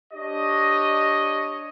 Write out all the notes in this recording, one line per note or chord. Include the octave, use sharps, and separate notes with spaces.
D4 G4 C#5 D#5